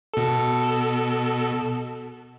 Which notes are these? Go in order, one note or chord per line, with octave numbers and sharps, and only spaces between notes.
B2 A4